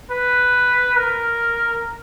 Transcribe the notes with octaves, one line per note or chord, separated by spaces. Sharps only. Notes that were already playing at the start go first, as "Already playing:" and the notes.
B4
A#4